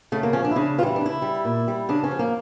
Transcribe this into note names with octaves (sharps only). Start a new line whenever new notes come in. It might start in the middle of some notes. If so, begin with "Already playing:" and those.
C#3 A3
A#3
F3 C#4
D4
E4
C#3 D4
E3 G3 E4 F4
D4
C#3 E4
G3
A#2
G3
C#3 D4
C#4
F3
A#3